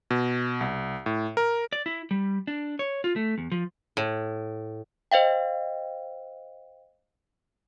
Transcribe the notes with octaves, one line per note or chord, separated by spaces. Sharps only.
B2
C2
A2
A#4
D5
E4
G3
D4
C#5
F4
A3
E2
F3
A2
C5 D#5 F5 G5